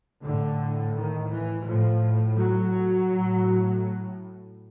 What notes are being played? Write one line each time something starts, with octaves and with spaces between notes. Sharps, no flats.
A2 D3
D#3
E3
A2 F3
F#3
A2